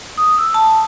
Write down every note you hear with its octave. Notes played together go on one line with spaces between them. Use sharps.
D#6
E6
A5